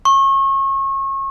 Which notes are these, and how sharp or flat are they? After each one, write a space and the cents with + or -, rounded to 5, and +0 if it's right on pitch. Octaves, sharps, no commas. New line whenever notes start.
C#6 -30